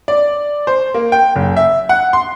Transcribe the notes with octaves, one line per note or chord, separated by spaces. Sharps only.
D5
C5
A#3
G5
F#1
E5
F#5
C6